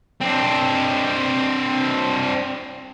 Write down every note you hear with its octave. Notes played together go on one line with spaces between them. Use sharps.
C4 D4